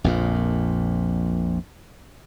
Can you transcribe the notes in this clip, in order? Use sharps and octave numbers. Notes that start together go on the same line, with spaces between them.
A#1 F2 A#2